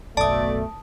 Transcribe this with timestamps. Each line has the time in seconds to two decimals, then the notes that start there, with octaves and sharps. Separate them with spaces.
0.17 F#1 B1 B2 A3 D5 A5 D#6